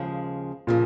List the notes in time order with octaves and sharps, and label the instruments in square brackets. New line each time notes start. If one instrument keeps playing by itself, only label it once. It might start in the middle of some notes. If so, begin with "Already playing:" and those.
Already playing: [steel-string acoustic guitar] D#2 C#3 F3 G#3
[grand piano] A#2 [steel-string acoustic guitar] C#3 F3